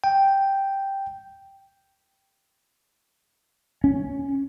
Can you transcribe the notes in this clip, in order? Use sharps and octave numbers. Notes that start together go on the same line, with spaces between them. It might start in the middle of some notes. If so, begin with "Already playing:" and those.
G5
C#4